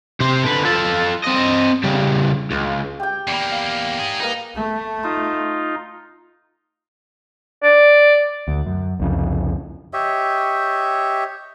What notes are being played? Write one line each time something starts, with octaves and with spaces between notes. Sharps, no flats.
C3 C5
D3 B4
F4 A4
C4 D#5
C#3 G3
C#2
G4 G5
E2 A#3 D5 B5
F5
D#4 G#4
A#3 D#4 A#4 B4
A3
D#4 F4
D5
D2
F#2
C2 F2 C#3
G4 C#5 D#5 E5